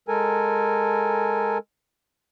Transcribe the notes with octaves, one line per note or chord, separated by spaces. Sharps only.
G#3 A4 A#4 G#5